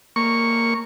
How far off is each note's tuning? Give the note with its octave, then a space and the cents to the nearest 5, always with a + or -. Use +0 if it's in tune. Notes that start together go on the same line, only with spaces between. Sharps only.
A#3 -10 C#6 +0